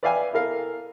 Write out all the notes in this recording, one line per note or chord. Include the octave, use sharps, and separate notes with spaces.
B4 D5 E5 F5 G5 G#5
E4 A4 A#4 F5